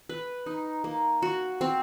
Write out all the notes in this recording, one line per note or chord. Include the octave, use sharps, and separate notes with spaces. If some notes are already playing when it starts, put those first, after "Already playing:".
B4
D#4
A#3
F#4
C4